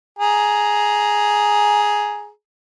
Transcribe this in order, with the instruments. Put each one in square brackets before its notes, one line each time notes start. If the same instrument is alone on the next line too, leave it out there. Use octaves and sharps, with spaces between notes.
[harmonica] G#4 A#5